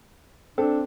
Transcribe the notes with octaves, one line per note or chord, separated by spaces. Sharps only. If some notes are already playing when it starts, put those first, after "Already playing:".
C4 D4 A4